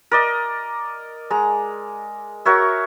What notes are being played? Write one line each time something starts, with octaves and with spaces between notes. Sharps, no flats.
A#4 D5 D#5
G#3 A#5
F#4 A#4 C#5 E5